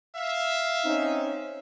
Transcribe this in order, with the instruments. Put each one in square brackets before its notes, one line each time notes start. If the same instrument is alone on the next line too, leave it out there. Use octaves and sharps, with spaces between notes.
[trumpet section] E5 F5
[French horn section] C4 C#4 D#4